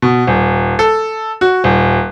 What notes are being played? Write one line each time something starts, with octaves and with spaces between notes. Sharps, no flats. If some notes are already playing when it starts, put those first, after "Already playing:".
B2
D#1
A4
F#4
D#1